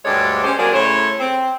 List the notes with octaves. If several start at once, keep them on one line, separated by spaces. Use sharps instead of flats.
D2 G2 G#3 A4 C#5 D5
C#4 G4 C5
F#3 A#3 C4 D4 G#4 A#4
A2 C#3 A3 C5 C#5
C4